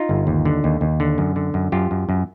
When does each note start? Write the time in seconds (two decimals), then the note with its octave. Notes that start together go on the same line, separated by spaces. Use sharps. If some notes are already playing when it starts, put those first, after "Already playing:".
Already playing: D#4 F4
0.09 G1
0.27 D#2
0.45 D3
0.64 D#2
0.81 D#2
1.00 D3
1.18 F#2
1.36 D3
1.54 F#2
1.72 F#2 F4 G4
1.91 F#2
2.09 F#2